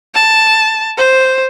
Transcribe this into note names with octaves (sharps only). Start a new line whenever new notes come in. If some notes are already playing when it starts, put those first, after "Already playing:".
A5
C5